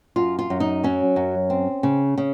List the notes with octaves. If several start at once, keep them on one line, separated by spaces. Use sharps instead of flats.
F#2 F4
F4
F#2
D#4
F#3 C#4
F#2
C4
C#3
C#3